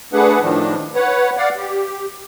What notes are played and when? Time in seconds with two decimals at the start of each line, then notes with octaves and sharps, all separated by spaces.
0.13 A3 D4 G#4 B4 F#5
0.40 A2 D#3 F3 D4
0.95 B4 C#5 F#5
1.37 D5 F5 F#5
1.57 G4